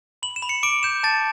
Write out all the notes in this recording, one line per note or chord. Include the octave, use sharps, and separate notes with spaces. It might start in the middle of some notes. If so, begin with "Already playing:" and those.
B5 F#7
E7
B5
C#7
D6 D7
G6 E7
A5 A6